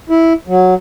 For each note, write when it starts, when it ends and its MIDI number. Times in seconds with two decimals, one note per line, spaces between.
0.10 0.33 64
0.48 0.74 54